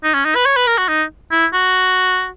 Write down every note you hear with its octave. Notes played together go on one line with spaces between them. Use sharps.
D#4
C#4
D#4
B4
C#5
B4
A#4
F#4
D#4
E4
F#4